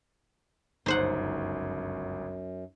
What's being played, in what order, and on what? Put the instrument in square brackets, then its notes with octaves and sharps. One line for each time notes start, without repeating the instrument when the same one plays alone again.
[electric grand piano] G1 C#2 [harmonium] F#2 [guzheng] D#4 C5 F#5